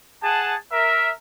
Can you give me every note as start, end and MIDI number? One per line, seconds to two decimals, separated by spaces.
0.23 0.54 68
0.23 0.54 78
0.23 0.54 81
0.72 1.10 70
0.72 1.10 76